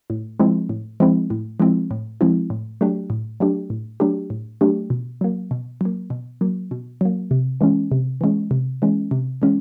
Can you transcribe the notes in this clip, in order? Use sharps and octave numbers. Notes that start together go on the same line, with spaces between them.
A2
F3 G#3 C4 E4
A2
F3 G#3 C4 E4
A2
F3 G#3 C4 E4
A2
F3 G#3 C4 E4
A2
F#3 A3 D4 G4
A2
F#3 A3 D4 G4
A2
F#3 A3 D4 G4
A2
F#3 A3 D4 G4
B2
F#3 A#3
B2
F#3 A#3
B2
F#3 A#3
B2
F#3 A#3
C3
E3 G#3 C#4
C3
E3 G#3 C#4
C3
E3 G#3 C#4
C3
E3 G#3 C#4